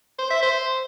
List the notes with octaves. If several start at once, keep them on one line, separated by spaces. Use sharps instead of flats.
C5
E5
C5